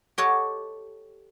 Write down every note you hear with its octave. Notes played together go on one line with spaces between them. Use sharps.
G4 A4 C#5 D#5 F#5